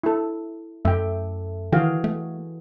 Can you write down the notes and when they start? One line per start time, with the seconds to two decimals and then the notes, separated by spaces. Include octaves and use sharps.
0.03 E4 A4
0.85 F#2 A3 E5 G5
1.72 D#3 E3 F#4 G#4 F5 G5
2.04 A3